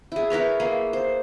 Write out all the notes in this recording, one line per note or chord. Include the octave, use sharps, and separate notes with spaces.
E4 G#4
E4 A#4 B4 C#5
A#3 G#4
C5